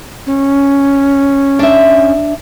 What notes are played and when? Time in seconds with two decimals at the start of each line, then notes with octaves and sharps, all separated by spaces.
0.26 C#4
1.59 D4 E5